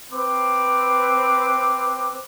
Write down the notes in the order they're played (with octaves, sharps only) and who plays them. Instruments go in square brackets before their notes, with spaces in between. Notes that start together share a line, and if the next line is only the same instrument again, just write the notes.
[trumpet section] C4 B4 D6